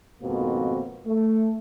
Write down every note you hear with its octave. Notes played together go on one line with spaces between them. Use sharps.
F2 G#2 B2 D#3 A#3 C4
A3